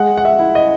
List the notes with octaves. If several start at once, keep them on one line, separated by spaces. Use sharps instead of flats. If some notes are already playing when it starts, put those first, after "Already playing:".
Already playing: G#3 F#5
F#5
E5
E4
D#5